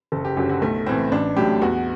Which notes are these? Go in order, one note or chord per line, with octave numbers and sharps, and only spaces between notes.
F#1 A4
G4
F#2 D3 F#3 G4
F#4
B1 A3
A2 E3 C4
A1 D4
A2 F#3 G4
E2 F#4